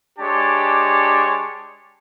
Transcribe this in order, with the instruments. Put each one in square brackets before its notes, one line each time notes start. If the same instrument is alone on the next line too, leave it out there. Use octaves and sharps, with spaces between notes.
[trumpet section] G#3 D4 G4 C#5 A5